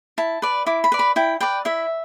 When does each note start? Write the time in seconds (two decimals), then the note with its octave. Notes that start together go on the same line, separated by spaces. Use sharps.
0.18 E4 A5
0.42 B4 D5
0.66 E4 D6
0.84 B5
0.92 B4 D5
0.99 B5
1.16 E4 G5
1.41 B4 D5 G5
1.65 E4 E5